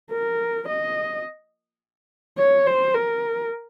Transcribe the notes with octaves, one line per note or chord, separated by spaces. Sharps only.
A#4
D#5
C#5
C5
A#4